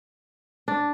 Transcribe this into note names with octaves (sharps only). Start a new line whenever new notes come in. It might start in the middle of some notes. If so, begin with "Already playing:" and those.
D4